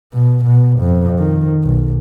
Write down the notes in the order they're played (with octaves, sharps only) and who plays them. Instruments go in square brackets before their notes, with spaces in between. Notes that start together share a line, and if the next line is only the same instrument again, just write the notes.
[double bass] B2
B2
F2
D#3
B1